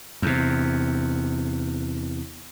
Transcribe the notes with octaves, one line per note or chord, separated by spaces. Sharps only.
E2 C3